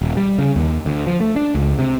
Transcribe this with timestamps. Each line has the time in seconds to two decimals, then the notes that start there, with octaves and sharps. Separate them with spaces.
0.02 D#1
0.17 G3
0.39 C#3
0.56 D#2
0.86 D2
1.07 F3
1.21 A3
1.36 D4
1.55 C#2
1.79 C3